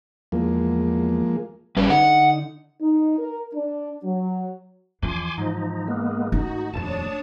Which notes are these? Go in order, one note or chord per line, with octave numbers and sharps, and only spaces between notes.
E2 F3 G#3 A#3
G1 G3 C#4 B4
D3 D#4 F#5
D#4
A#4
D4
F#3
E2 E3 F3 G#5 C6 D6
G#2 F3 D#4
G#3 A#3 B3
D#3 A3 D#4 F#4
D#1 F2 D4 C#5 A5 D#6